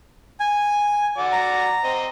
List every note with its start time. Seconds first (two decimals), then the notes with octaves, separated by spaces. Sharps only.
0.40 G#5
1.18 F#4 D5
1.32 A#5
1.84 C4 D#5